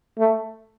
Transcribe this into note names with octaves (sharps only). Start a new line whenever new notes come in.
A3